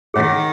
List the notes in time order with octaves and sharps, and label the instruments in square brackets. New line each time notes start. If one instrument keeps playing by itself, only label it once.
[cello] D#3 [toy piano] G#4 C#5 F#5